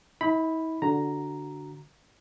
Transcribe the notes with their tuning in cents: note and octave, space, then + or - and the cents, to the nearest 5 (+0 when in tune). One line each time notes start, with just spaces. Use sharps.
E4 -45 B5 +0
D3 -5 F#4 +0 A#5 +0